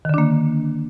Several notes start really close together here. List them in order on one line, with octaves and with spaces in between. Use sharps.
D#3 D3 D4 A#3